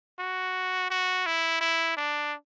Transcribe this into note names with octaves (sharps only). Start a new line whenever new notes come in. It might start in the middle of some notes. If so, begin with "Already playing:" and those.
F#4
F#4
E4
E4
D4